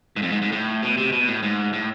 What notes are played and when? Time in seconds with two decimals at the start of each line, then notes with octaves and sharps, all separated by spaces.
0.16 G#2
0.22 F2
0.32 G#2
0.42 G#2
0.52 A2
0.83 B2
0.97 C3
1.12 B2
1.27 A2
1.43 G#2
1.73 A2